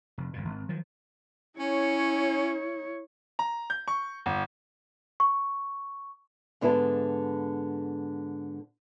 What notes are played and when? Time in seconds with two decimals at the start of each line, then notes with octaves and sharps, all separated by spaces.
0.18 F1
0.33 G1 F2 A#2
0.45 G#1
0.69 D#3 F3 F#3
1.59 C#4 E4 C#5
3.39 A#5
3.70 G6
3.88 C#6
4.26 G1
5.20 C#6
6.61 G#2 D3 B3 E4 F#4 A4